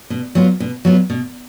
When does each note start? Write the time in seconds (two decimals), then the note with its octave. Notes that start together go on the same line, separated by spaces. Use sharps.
0.10 B2
0.35 F#3 B3 F4
0.60 B2
0.85 F#3 B3 F4
1.10 B2